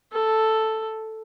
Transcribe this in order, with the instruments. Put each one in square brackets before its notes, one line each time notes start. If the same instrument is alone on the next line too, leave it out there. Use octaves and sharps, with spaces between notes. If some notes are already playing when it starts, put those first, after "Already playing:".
[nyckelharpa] A4